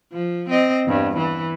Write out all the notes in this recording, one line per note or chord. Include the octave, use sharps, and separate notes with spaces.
F3
C4 D#5
E2 G2
E3